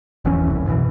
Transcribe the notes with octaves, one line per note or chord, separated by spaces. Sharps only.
F1 E2 E3 C#4
F#1 C2
F#2 B2 D#3 E3